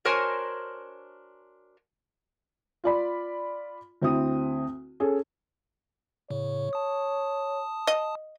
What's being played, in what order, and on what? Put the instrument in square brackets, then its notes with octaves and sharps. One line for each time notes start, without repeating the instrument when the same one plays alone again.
[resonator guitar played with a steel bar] D4 F#4 A#4 C5 C#5 G#5
[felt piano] F4 D5 B5
D2 C4 E4 D#6
C#4 G#4 A4
[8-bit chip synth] A2 C#3 [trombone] C#5
[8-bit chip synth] A5 D#6
[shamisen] D#5